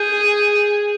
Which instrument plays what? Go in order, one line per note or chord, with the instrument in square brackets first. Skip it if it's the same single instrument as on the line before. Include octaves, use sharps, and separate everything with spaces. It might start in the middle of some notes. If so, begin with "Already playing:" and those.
Already playing: [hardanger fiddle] G#4 [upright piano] G6